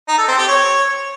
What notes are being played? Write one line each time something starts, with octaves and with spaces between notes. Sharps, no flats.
D#4
A4
C4
G4
C#5